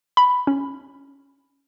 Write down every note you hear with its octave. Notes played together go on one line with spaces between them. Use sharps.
B5
C#4